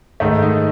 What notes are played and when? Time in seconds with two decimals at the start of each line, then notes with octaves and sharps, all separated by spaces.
0.20 G#2 D#3 A3 D#4
0.42 D#4